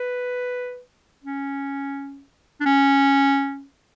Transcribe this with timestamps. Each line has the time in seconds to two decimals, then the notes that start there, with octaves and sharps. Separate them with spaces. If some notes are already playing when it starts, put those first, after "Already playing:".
Already playing: B4
1.24 C#4
2.60 D4
2.66 C#4